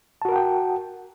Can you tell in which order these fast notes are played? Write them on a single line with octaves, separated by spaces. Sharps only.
A5 F#4 A#4 F#5 G5